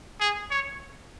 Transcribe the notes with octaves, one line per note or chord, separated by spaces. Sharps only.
G#4
C#5